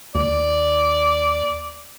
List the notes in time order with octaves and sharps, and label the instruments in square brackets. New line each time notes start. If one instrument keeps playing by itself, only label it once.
[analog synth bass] D#2 [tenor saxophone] D5